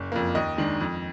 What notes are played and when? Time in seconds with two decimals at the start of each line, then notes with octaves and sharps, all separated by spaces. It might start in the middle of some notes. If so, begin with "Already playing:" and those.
Already playing: F#1
0.12 F2 F3 A#3
0.35 D#2 D#5
0.58 D#3 G#3 D4
0.81 F2